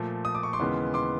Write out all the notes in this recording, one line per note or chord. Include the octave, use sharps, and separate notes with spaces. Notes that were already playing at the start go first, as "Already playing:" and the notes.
Already playing: A#2 F3 A3
D#6
D6
C#6
C6 D6
D#2 C#3 E3 G#3 B3
C6 D6